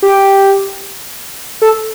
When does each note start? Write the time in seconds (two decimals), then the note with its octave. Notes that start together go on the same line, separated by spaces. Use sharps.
0.02 G4
1.62 A4